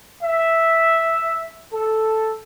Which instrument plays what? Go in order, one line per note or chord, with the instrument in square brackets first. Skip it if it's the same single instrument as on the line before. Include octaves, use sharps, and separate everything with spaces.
[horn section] E5
A4